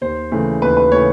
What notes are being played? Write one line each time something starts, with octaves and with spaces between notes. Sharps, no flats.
D#2 C5
C#3 E3 A3
D#2 B4
B4
C#3 E3 A3 C#5